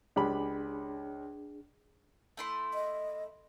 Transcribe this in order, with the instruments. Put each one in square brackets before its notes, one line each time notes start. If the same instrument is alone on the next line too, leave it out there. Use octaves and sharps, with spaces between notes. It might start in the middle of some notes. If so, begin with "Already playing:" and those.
[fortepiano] C#2 G4 B5 [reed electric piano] D4 G#4
[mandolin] A3 E4 C6
[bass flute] D#5